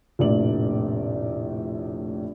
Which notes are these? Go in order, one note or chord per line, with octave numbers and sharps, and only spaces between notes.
F1 A#1 A2 D5 F#7